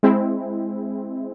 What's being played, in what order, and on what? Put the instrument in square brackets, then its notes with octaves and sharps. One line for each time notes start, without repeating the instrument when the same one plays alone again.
[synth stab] G#3 C4 E4